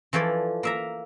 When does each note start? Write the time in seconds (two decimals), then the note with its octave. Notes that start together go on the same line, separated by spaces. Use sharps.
0.13 E3 F3 A4 C#5 D5
0.63 A#3 E5 A#5